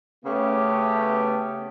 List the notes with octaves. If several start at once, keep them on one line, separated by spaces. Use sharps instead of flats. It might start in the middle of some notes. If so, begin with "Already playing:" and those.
C#3 A3 B3 C#4 G4